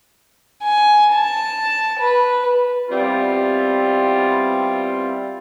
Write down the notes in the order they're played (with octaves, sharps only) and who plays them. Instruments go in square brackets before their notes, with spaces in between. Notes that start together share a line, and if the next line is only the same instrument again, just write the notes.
[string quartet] G#5
A5
B4
[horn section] G3 B3 C4 E4 F4